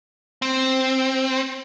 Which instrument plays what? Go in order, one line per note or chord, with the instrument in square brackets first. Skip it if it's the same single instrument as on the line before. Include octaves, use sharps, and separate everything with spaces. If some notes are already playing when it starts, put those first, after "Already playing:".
[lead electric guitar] C4